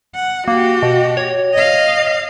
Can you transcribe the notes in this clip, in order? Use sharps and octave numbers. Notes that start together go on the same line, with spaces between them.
F#5
A#3 F#4 G4
B2
C#5
D#5 F5